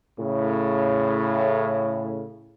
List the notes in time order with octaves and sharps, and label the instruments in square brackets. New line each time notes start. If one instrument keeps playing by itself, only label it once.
[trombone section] A2 C#3